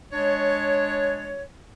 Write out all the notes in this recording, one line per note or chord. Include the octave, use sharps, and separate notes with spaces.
G#3 D4 C#5